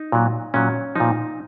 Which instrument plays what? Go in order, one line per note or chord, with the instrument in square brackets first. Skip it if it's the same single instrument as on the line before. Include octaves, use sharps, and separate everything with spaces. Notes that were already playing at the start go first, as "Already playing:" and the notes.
Already playing: [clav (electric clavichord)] D#4
A#2 F#3
A#2 F#3 C#4
A#2 F3 D#4